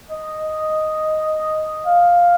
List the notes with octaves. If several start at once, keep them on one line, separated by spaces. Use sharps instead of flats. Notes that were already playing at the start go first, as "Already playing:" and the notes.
D#5
F5